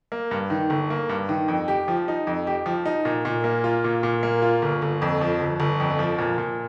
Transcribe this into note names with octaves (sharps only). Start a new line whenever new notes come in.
A#3
G2
D#3
G1
A#3
G2
D#3
F2
G4
F3
D#4
F2
G4
F3
D#4
A#2
A#2
A#3
F4
A#2
A#2
A#3
F4
G1
G1
F2
F3
G1
G1
F2
F3
A#2
A#2